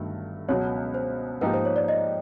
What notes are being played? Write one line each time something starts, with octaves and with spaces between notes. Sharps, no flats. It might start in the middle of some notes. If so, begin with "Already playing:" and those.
Already playing: G1 G2 D#3 F#3 A3
C#2 B2 F#3 C#5
C5
G#2 F3 A#3 D#4 G4 B4
C5
C#5
D5
D#5